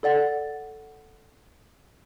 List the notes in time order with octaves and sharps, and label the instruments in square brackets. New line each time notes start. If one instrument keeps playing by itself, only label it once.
[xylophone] A4 D5 F#5 A6